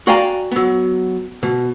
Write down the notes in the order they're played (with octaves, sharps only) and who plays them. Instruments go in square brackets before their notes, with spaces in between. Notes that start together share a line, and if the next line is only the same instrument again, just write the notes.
[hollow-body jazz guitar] F#4 D5 F5 G5 G#5 A#5
F#3 B3
B2